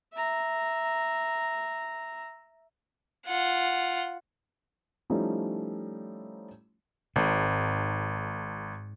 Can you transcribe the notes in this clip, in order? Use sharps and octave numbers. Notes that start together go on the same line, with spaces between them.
E5 A#5
F4 F#5
F3 G3 A3 C#4 D#4 E4
G#1 G#2